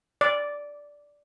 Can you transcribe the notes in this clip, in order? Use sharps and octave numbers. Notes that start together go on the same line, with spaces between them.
D5